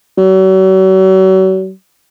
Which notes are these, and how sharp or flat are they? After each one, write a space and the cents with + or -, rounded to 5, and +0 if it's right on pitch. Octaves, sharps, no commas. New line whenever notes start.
F#3 +40